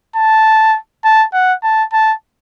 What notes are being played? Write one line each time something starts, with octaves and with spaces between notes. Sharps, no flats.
A5
A5
F#5
A5
A5